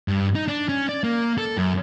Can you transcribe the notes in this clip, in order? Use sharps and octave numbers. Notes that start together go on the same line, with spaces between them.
G2
D#4
D4
C#4
D5
A#3
A4
F#2